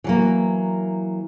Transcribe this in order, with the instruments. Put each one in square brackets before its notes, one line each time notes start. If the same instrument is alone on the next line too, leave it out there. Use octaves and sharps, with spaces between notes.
[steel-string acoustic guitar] E3 F#3 A#3